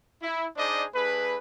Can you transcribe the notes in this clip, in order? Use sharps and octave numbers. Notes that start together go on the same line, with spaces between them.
E4
D4 D#4 G#4 C5 D5 D#5
A3 D4 G#4 B4